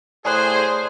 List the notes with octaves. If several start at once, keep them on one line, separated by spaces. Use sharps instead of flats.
A2 G#4 C5 D5 F#6